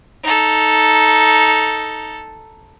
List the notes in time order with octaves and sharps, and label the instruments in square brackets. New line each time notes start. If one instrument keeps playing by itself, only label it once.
[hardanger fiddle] D#4 A4